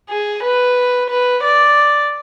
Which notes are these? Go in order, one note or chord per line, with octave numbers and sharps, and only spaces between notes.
G#4
B4
B4
D5